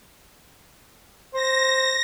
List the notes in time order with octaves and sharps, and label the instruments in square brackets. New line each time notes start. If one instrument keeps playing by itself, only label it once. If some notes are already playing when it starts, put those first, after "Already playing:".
[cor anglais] C5 [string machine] A#6